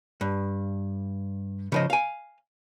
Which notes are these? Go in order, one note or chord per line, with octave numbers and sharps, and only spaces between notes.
G2
C#3 F3 D#5
F5 G#5